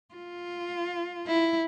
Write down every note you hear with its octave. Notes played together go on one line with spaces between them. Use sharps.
F4
E4